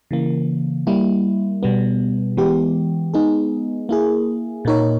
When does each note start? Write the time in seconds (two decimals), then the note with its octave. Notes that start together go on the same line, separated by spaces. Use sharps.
0.11 C#3 E3 A#3
0.87 G3 A#3 E4
1.63 B2 G3 B3
2.37 E3 G#3 B3 G4
3.14 G#3 B3 D#4 G#4
3.89 A#3 E4 G#4
4.65 A#2 A#3 D#4 A#4 C#5